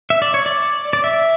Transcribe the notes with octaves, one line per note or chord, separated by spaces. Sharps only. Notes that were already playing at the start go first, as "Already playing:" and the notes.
E5
D5
C#5
D5
D5
E5